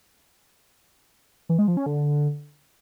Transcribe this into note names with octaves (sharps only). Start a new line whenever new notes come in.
E3
G#3
F3
C#4
D3